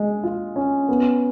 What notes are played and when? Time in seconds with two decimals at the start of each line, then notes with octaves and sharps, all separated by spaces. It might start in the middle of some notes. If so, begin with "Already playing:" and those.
Already playing: G#3 G#4
0.24 F4
0.56 C#4
0.89 B3